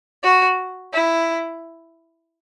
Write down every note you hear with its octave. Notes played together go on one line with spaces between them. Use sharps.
F#4
E4